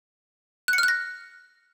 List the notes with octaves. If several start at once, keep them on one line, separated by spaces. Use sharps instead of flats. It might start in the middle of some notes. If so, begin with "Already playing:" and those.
F#6
C#7
F6
F#6
A#6